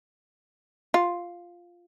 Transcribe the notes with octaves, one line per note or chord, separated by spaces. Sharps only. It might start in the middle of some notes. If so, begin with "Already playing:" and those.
F4